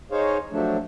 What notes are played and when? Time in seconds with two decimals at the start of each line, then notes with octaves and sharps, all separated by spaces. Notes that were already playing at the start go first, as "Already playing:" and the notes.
0.11 D#4 G#4 C5 C#5 F5
0.52 F3 F#3 A3 D4